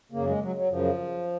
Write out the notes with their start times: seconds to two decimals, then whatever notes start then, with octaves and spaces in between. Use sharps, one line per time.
0.12 F#2 C#3 A#3
0.27 G#3
0.41 F#3
0.56 F#3
0.70 F#2 C#3 F3